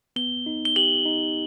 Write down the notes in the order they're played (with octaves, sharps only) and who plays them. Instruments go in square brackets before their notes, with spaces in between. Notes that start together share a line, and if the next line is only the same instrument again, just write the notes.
[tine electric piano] B3 [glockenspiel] G7
[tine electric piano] D#4
[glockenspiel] G7
[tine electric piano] G4 [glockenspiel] F#7
[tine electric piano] D#4